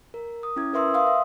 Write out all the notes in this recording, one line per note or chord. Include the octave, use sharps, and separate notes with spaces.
A#4
D#6
C#4 E4 G#6
A#4 B4 E5 C6 D#6 E6
F5 C6 D#6
E5